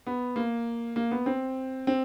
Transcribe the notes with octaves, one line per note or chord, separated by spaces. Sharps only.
B3
A#3
A#3
B3
C4
C4